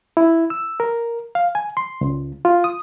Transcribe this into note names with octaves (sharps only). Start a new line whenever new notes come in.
E4
E6
A#4
F5
G#5
C6
C#2
F4
D#6